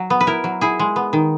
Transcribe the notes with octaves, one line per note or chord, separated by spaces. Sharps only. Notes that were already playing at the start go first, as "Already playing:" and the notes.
Already playing: F#3
B3
B4
E4 A#4
F#3
E4 G#4
G#3
B3
D#3